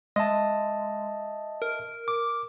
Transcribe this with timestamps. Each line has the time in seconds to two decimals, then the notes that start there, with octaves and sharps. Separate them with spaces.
0.16 G#3 D#5 E5 A5
1.62 A#4
2.08 D6